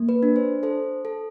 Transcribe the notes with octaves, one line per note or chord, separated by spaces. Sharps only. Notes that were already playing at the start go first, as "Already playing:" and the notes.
Already playing: A#3
B4
D4
C5
A4 C5
A4